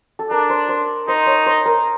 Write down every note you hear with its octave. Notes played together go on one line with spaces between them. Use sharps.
A4
D4 A#4
C5
C5
D#4 C5
C#5
C5
A#4